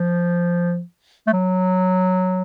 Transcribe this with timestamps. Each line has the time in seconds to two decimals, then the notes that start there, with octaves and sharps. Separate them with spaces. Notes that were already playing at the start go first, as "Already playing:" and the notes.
Already playing: F3
1.27 A3
1.33 F#3